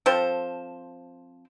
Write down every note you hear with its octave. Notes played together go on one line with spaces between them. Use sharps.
F3 C4 A4 C5